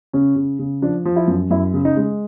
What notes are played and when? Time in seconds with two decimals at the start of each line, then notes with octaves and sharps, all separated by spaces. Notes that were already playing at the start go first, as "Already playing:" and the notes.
0.13 C#3 C#4
0.36 C#3
0.59 C#3
0.82 F3 D4
1.05 F3
1.16 E4
1.27 F#2
1.50 F#2 E4
1.74 C#3
1.85 D#4
1.97 G#3